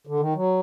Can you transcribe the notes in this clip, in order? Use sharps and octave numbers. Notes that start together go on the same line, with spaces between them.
D3
D#3
F#3